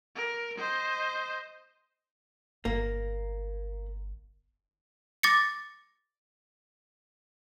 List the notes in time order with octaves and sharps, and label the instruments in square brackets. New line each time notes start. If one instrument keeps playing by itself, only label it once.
[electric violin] A#4
C5 D#5
[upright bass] G1 [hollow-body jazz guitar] A#3
[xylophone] D6 A6 A#6 C#7